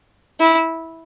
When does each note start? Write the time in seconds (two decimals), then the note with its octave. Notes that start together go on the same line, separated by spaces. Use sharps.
0.40 E4